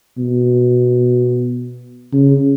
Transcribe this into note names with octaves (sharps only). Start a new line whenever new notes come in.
B2
C#3